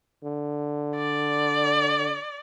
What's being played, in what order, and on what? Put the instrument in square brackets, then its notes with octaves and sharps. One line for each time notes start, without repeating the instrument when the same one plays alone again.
[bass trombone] D3
[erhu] D5